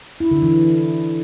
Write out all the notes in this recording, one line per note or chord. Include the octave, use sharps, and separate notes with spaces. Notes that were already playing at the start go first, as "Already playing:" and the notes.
E4
D3
E3